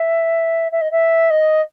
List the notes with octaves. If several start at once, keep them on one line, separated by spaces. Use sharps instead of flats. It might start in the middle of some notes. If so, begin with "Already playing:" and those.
Already playing: E5
E5
D#5
E5
D#5